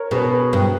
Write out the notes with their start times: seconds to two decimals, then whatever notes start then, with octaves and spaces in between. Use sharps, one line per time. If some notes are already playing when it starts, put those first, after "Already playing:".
Already playing: A#4 C#5
0.11 B2 G#4 B4
0.31 G#4 B4
0.53 G2